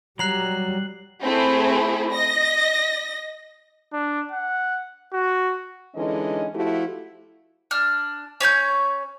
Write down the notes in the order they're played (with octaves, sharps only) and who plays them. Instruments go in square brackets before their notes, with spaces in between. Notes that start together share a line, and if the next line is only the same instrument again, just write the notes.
[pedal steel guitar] F#3 A#5 [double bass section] G3 [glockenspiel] F#6 C7 F#7
[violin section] A3 C4 E4 G#4
D#5 A#6
[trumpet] D4
F#5
F#4
[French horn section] D3 E3 G#3 C#4 D#4 D#5
F3 A3 E4 F#4 G4
[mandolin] D4 F6
C#4 C#5 B5 G6